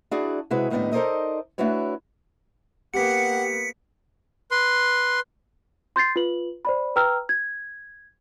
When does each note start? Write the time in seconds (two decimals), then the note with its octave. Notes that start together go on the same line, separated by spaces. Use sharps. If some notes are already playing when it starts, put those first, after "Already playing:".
0.11 D4 E4 F#4 G#4 D5
0.50 C3 G#3 E4 F#4 G#4 B4
0.70 D#2 A2 G3 B3 D4 D#5
0.93 D#4 A4 A#4 C5 D5 D#5
1.58 A3 D4 E4 F#4 B4 C#5
2.94 A#3 B3 G4 F#5 B6 C#7
4.51 B4 C6
5.96 C6 G6 A6 C7
6.16 F4 B4 F#7
6.65 C5 D5 B5
6.96 B4 G5 A#5 E6 F6
7.29 G#6